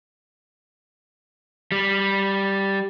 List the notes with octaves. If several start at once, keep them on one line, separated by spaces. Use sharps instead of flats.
G3